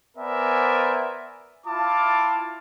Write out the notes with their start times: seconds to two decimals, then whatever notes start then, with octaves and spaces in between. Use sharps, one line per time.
0.17 B3 A#4 C5 D5 E5 G#5
1.66 E4 F4 F5 A5 D6